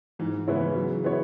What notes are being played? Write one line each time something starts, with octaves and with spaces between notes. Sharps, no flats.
G#2 E3
E3
C#3 G#3 B3 E4 C#5
E3
F#3
B3 E4 C#5